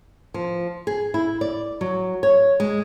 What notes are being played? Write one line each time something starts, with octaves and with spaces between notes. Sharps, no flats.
F3
G#4
E4
D5
F#3
C#5
G#3